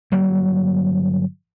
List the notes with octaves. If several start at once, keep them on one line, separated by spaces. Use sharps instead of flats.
G1 F#3 G3 A#3